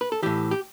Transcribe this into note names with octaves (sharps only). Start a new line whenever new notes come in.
B4
A4
A2 E3 G4
G4